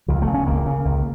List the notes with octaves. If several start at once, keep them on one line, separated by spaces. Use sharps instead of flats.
C#2 F3
A3
C#3
C#4
C#2 A#3
C#3
C#2